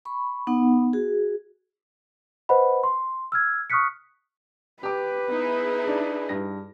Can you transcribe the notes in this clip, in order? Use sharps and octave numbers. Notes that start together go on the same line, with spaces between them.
B5 C#6
B3 D#4 F#5
F#4 G#4
B4 C5 D#5 F#5 B5
C6
E6 F6 G#6
C#6 D#6 F6 F#6 B6 C#7
G4 B4 D6
B3 D#4 E4 G#4
D4
G2 A#6